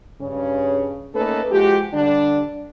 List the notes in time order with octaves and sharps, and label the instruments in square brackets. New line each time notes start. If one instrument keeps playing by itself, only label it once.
[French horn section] G2 C#3 C#4
A3 A#3 C#4 D#4 A4 B4
F3 G#3 F#4 G4
D3 G3 D4